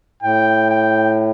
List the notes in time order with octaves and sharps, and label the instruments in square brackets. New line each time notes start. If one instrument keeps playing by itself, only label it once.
[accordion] A2 [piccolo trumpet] G5
[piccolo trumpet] G5